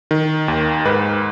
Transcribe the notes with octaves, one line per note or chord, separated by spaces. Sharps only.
D#3
D#2
G#2 B4